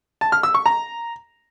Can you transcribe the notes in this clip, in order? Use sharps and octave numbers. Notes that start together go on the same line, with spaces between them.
A5
F6
E6
C#6
A#5